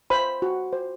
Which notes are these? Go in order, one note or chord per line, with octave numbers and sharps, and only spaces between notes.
C5 B5
F#4
C5